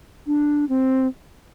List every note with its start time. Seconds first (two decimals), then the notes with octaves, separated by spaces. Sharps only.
0.27 D4
0.69 C4